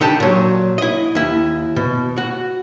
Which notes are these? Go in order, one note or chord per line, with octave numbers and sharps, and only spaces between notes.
D3 D#4 G4 A5
A#2 F#3
E4 D#5
D#2 E4
B2
F#4